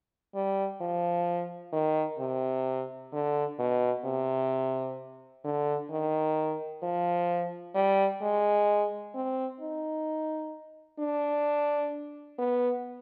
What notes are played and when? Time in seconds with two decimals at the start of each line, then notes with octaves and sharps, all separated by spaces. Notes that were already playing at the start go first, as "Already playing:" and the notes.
0.35 G3
0.81 F3
1.73 D#3
2.19 C3
3.13 D3
3.59 B2
4.05 C3
5.44 D3
5.90 D#3
6.83 F3
7.75 G3
8.22 G#3
9.15 C4
9.61 D#4
10.99 D4
12.39 B3